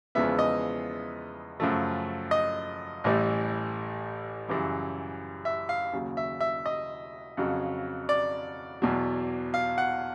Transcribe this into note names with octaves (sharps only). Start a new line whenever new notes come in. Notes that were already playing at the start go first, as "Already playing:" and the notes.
E2 C#3 F3 G#3 B3 E5
D#5
F#2 C#3 F3 A3
D#5
A1 A2 E3 G3
F#2 C#3 E3 G3
E5
F5
D#2 C#3 F#3
E5
E5
D#5
F2 C#3 F#3
D5
E2 B2 F#3
F5
F#5